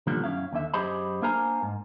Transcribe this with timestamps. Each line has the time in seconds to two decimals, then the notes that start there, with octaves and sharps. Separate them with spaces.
0.07 B2 D3 D#3 F3 G3 A#3
0.24 F#2 C3 C#4 E4 F5
0.52 D#2 D3 E5
0.74 F#2 G4 G#4 C5 D#5 B5
1.22 A#3 D4 A#4 C5 G#5 A#5
1.63 G#2